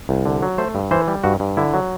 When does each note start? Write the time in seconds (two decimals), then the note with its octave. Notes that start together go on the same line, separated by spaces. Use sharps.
0.09 C2
0.26 D3
0.42 F#3
0.58 A3 C5
0.75 G2
0.91 E3 C5
1.08 G3
1.24 G2 F#4
1.40 G2
1.57 D3 E4
1.74 F#3